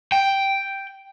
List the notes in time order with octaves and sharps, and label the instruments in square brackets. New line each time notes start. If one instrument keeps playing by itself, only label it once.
[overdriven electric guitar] G5